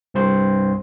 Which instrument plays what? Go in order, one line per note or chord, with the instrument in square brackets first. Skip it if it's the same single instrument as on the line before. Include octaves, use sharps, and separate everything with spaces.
[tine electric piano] C2 G2 C4 C5 C6